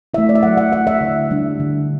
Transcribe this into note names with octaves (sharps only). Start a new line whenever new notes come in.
A3 E4 E5
D5
E5
F#3 F#5
F#5
A3 E4 F#5
E5
D3
G3 D4
D3